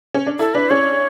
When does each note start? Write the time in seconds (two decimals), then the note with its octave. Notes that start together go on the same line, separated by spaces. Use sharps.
0.14 C#4
0.26 D4
0.39 E4 A4
0.54 D4 B4
0.70 C#4 C#5